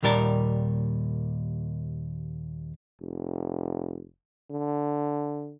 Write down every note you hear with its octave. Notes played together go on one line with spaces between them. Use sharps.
D#2 A#2 G3 A#4 A5
F1
D3